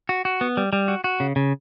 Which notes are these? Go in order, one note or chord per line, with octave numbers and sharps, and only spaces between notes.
F#4
F#4
B3
G3
G3
F#4
F#4
C#3
C#3